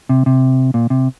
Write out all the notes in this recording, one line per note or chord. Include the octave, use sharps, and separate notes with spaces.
C3
C3
A#2
C3